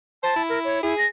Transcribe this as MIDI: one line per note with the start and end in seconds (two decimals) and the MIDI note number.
0.23 0.33 72
0.23 0.42 81
0.36 0.80 64
0.49 0.59 70
0.64 0.82 73
0.83 0.96 64
0.83 1.05 68
0.98 1.06 94